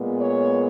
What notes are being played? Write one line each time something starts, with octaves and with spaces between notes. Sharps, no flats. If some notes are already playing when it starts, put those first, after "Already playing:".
Already playing: A#2 G#3 B3
C#5